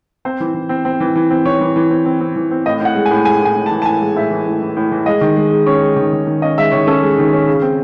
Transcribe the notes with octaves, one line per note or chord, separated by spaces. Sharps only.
C4 C5
E3
E3
C4
C4
E3
E3
C4
E3 C#5
E3
E3
C4
C4
C4
E3
C4
A2 D#5
A2 F#5
G#3
G#5
A2
G#3 G#5
A2 G#5
A2
A5
E3
A5
A2 G#5
G#3
A2 E5
E3
A2
E3
A2
E3
G#3 D#5
D#3
G#3
G#3
C#4 C#5
G#3
D#3
D#3
D#3
C#4 D#5
G#3 E5
D#3 C#5
C#4 A4
G#3
D#3
C#4
C#3
C4